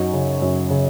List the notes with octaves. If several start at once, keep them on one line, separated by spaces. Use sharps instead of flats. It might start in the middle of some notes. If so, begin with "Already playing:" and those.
Already playing: F#2 D#4 F#4
C#3
F#2
C#3